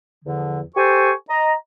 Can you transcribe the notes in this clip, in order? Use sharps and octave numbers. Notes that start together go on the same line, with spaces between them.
E2 D3 F3
G4 A4 C5 G#5 C#6
D#5 A#5